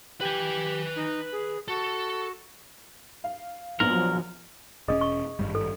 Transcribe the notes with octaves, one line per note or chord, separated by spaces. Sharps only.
G4 B4 G#5
D#4
G#4
F#4 A4
F5
A#1 F3 F#3 B3 A#4 F#7
E1 C4 C#4 G#4 D#5 D#6
C#6
G#1 G2 G3
A4